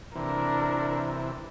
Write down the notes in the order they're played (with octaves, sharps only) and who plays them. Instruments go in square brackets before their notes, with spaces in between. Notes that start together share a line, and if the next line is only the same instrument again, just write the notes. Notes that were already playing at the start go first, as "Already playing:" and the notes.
[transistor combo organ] C3 E3 [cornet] D4 [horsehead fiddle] A#4